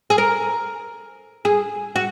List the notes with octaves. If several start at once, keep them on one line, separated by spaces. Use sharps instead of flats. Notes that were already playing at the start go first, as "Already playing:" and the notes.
G#4
A#4
G#4
F#4